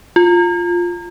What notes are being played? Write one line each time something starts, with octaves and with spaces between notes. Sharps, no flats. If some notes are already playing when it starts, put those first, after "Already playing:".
F4